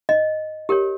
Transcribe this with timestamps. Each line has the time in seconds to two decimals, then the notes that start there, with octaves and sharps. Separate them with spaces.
0.09 D#5
0.69 G4 A#4 C#5